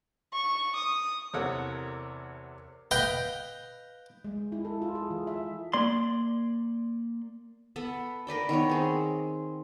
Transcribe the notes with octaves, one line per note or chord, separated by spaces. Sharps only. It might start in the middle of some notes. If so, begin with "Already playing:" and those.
C#6
D#6
E2 C3 A4 A#4 C#5 F#5
B4 D#5 F5 G5
G#3
E4
A4
F4
G#4
E3
E5
A#3 D5 C6
B3 A4 F#5 B5
A#4 B4 D5 G5
D#3 B3 A#4 C#5
C4 G#4